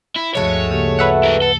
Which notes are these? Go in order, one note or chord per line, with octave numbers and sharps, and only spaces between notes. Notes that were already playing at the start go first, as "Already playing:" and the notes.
E4
D2 G2 F3 G#3 A3 F#4 C#5
C#3 A#3 G4
B4 E5 F#5
E4 A#4
A4